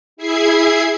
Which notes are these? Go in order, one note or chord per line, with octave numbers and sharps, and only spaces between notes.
E4 G#4 E5 G#6 C7